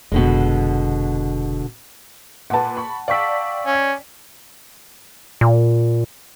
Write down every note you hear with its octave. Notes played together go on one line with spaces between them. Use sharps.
F1 B2 D3 G#3
A#2 B4 F#5 A5
B5 C#6
D5 F5 G5 C#6 E6 B6
C#4
A#2